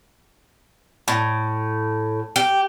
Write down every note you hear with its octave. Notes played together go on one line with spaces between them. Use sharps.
A2
G4